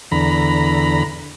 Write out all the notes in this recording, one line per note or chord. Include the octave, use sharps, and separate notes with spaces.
E2 D3 A#5 B5